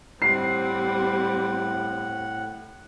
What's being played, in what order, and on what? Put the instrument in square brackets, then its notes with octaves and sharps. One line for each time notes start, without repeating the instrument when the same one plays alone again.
[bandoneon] A2 F#5 [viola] G3 C4 [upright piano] C7